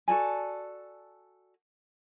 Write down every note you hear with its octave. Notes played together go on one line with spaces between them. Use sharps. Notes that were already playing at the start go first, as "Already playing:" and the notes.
F#4 A4 D5 G#5